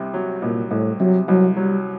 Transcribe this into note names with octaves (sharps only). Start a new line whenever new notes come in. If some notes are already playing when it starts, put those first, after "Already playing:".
Already playing: C2 C3
F#3
C2 A#2
C2 A2
C3 F#3
C2 F#3
F#3 G3